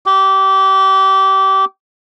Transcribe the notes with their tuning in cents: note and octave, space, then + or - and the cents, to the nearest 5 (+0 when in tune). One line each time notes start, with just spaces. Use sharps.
G4 -25